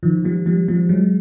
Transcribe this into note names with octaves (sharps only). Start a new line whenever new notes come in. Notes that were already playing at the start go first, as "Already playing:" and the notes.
D#3 F3
F3 G3
F3 G3
F3 G3
F#3 G#3